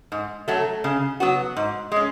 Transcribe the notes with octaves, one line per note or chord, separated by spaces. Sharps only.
G#2
F#3 A3
C#3
F#3 B3 F#4
G#2
G#3 C#4